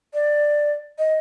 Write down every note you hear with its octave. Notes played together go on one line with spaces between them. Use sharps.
D5
D#5